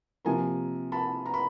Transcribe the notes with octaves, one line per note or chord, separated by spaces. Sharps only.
C3 F3 A#3 G#5 A#5
A5 B5
A#5
B5